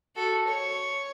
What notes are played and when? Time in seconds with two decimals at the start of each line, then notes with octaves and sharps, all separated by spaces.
0.16 F#4 A4
0.47 C#5